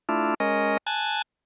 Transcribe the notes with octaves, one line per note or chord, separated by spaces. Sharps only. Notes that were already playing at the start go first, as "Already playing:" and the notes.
A3 D4 E4 F4
G#3 C#4 A#4 D#5
G#5 A5 F#6